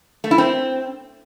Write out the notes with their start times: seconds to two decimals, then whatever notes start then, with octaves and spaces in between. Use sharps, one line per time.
0.24 A3
0.31 E4
0.38 C4